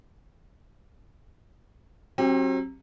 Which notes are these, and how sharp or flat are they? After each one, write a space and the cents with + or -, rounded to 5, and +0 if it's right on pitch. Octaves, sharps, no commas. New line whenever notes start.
F#3 +0 C4 +40 G4 +0